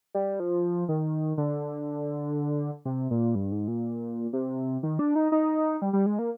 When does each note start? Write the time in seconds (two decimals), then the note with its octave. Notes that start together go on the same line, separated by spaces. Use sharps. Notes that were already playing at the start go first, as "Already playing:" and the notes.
0.15 G3
0.40 F3
0.89 D#3
1.37 D3
2.85 C3
3.11 A#2
3.35 G2
3.52 G#2
3.68 A#2
4.33 C3
4.83 D#3
4.99 D4
5.15 D#4
5.32 D#4
5.82 G3
5.93 G3
6.06 G#3
6.19 A#3